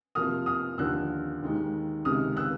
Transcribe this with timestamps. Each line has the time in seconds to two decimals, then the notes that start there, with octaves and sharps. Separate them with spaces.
0.15 F2 C3 F3 A#3 D#6 F6
0.46 D#6 F6
0.78 D#2 D3 F3 E6 F#6
1.42 D#2 D#3 G#3
2.05 C#2 C3 D#3 G#3 D#6 F6
2.37 E6 F#6